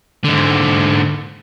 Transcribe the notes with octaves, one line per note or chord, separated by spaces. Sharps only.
G#2 D3